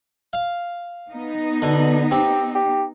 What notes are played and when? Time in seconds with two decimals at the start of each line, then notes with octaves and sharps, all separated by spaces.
0.33 F5
1.10 B3 D#4
1.62 B2 D3
2.11 C4 G4
2.55 G4